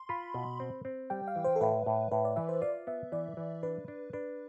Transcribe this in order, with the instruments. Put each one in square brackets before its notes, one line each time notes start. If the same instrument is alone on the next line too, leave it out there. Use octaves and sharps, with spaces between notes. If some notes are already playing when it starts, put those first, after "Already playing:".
Already playing: [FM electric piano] C6
[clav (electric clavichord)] F4 [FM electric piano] B5
[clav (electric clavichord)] B2
C4
C4
[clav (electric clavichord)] G3 [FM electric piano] G5
[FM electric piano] F5
[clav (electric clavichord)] E3
[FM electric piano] C5
A4
[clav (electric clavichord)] A2 [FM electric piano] B4
[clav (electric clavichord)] A2
[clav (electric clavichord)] A2 [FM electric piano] B4
[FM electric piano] D5
[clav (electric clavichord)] E3 [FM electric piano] E5
[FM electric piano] C5
[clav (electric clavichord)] F4 [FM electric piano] D5
[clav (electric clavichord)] B3 [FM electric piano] E5
[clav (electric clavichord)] E3 [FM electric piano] D5
[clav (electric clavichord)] E3
[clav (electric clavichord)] D4 [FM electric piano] B4
[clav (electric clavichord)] D4
[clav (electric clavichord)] D4 [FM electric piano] B4